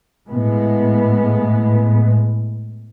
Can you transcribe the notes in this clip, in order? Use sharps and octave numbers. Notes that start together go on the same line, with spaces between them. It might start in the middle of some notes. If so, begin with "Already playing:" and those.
A2 G#3 B3